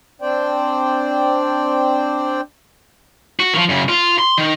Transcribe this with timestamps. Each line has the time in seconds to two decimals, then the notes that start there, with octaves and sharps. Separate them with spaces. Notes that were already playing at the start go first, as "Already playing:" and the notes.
0.22 C4 D4 C5 D5 G5
3.40 F#4
3.54 D#3 F3
3.69 F#2 C#3
3.89 F4
4.19 C6
4.38 D#3